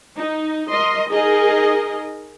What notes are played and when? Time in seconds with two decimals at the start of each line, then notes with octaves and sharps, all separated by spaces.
0.18 D#4
0.69 A#4 D#5 C6
1.09 D#4 G#4 A#4 D#5